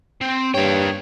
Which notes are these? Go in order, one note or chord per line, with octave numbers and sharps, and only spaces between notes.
C4
G2 A#3 C#5 G5